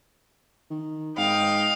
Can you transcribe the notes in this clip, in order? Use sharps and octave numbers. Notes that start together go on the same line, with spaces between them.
D#3
G#2 D#5 F5 G5